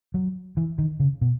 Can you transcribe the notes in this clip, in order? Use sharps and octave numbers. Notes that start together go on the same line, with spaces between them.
F#3
E3
D#3
C#3
B2